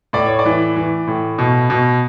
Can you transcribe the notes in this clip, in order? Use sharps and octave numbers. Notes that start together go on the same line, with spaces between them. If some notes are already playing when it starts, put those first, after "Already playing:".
A2 D5
C#5
D5
E3
E3
A2
B2
B2